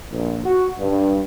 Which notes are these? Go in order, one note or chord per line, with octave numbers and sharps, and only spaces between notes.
A#1
F#4
G2